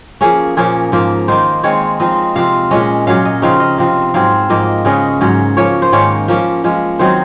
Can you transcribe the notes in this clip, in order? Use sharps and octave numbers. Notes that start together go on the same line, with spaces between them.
F3 A#3 C#4 G#4
A#2 F3 A#3 C#4 G#4
G#2 F3 A#3
D#3 A#3 D#4 C5
D#3 G#3 C4 C#5
F3 C4 D#4 D#5
C3 F3 C4 F5
A#2 G#3 C#4 D#5
A#2 F#3 C#4 F5
D#5
C#3 F3 C4 D#4 F5
D#5
C3 F3 C4
G#2 F#3 C4 F5
G#2 F3 A#3 D#5
C#3 G#3 C#4 D#5
G#2 F#3 C#4
F3 A#3 C#4 C#5
C5
G#2 D#3 A#3 C#4 C#5
F3 A#3 C#4
F3 G#3 C#4
D#3 F#3 C4 D#4 C5